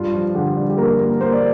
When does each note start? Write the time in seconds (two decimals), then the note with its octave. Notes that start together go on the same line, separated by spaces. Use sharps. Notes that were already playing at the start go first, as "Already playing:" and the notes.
Already playing: G2 F4
0.14 F3
0.35 D3 G4
0.57 G2
0.70 G4
0.78 A#3 A#4
0.99 A#3
1.21 A#3 C5
1.33 D5